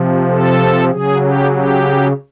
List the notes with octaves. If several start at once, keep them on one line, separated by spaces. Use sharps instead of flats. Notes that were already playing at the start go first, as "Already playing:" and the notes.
Already playing: C3 F3
A4
C#3 F#3 G#4
G4
G4